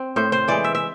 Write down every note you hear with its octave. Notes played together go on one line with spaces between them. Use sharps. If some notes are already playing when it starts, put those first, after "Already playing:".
Already playing: C4
A2 C5
C5
E3 G#3 D5
E5
E5